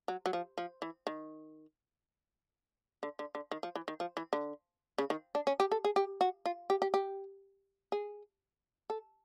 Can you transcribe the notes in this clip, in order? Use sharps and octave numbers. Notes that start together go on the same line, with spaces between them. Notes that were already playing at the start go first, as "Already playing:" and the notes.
F#3
F#3
F3
F3
E3
D#3
D3
D3
D3
D#3
F3
E3
D#3
F3
E3
D3
C#3
D#3
D4
C#4
G4
A4
G#4
G4
F#4
F4
G4
G4
G4
G#4
A4